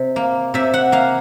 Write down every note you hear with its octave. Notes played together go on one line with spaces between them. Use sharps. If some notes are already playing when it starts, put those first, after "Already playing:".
Already playing: C3
A#3
C3 E5
F#5
A#3 F5